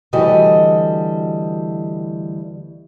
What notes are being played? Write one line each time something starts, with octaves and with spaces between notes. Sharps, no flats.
D2 E3 G3 F#4 A4 D#5